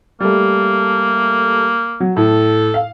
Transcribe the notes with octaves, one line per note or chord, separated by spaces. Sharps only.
G3 A3 A#3
F#3
A2 A4
F5